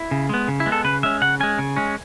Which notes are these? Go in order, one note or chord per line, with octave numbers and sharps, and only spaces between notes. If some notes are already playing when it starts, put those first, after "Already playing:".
Already playing: E4
C#3
G#3 B3
C#3
E4
G#3 B3
A4
C#3 B4
G#3 C#4 E5
C#3 F#5
G#3 C#4 G#5
C#3
G#3 C#4